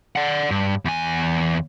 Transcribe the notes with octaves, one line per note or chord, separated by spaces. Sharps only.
D5 F#5
G2
E2 G#5